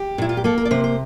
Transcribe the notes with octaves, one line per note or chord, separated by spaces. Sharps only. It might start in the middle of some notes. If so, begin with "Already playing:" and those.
Already playing: G4
A#2 E4
F4
G4
A#3 A4
A#4
D5
C3 C5
C5